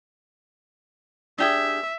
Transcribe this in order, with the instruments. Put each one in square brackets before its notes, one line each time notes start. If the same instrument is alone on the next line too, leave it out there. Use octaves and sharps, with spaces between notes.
[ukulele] D4 G4 G#4 [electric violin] E5